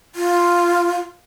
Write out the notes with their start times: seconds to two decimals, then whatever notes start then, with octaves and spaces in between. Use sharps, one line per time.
0.15 F4